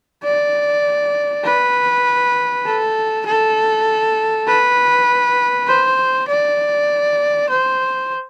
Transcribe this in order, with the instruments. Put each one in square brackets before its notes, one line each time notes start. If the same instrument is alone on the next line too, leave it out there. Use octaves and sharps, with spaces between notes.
[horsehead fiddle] D5
B4
A4
A4
B4
C5
D5
C5